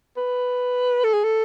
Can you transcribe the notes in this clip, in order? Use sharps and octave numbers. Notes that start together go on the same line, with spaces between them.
B4
A4
G#4
A4